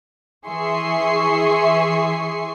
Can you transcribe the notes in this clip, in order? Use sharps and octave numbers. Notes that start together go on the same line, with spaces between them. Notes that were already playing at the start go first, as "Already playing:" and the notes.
E3 G#4 E5 C6 C#6 C7